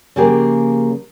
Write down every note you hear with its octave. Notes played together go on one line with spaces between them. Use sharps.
C#3 F3 A#3 G4 G#4